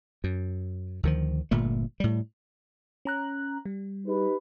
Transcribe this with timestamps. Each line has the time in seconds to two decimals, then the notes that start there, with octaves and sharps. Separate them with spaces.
0.24 F#2
1.03 D2 D#3 F3
1.51 G1 A#2 A3
2.00 A2 G3
3.05 C#4 A#5 F#6
3.66 G3
4.07 D#4 G4 B4